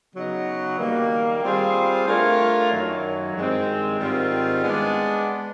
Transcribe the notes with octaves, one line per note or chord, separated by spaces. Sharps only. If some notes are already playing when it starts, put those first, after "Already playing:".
C#3 F#3 B3 D#4 F#4
D#3 G3 A#3
G3 C4 F4 G#4 C5
A3 D4 F4 A#4 C#5
F#2 D#3 F#3
G2 D#3 G#3 C4
G#2 D#3 G3 C4 F4
G#3 B3 D4